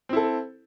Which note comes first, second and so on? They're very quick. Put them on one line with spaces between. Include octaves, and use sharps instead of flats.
C4 E4 A4